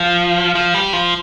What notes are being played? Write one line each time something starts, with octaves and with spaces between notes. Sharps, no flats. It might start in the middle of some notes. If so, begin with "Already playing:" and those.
Already playing: F3
F3
G3
F3